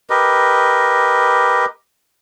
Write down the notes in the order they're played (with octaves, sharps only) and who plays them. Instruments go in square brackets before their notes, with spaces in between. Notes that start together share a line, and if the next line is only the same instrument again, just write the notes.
[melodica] G4 A#4 B4 D#5